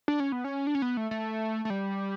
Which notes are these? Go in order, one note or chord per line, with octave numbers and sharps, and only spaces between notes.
D4
C#4
B3
C#4
D4
C#4
B3
A3
A3
A3
G3